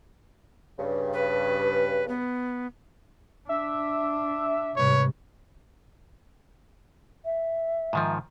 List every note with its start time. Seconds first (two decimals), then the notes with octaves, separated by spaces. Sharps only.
0.79 G2 C#3
1.13 B4
2.08 B3
3.49 D4 E5
4.76 G#2 C3 G3 B4 C#5
7.25 E5
7.93 G#2 D#3 F3